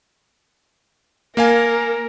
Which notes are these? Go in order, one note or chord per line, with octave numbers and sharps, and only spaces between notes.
A#3 A#4 F5 G#5